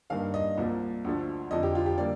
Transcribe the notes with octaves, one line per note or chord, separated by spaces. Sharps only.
G2 D#3 A#3 F5
D#5
C2 A#2 F3 A#3
D2 D3 F3 A3
F1 F2 D3 F3 D#5
G4
F4
G4
D3 G3 A#3 D5